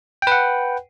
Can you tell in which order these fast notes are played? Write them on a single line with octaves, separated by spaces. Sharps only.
G5 B4 F#5